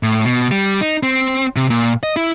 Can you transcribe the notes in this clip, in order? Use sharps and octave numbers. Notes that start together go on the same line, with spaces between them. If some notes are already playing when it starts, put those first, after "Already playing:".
A2
B2
G3
D#4
C4
C3
A#2
D#5
E4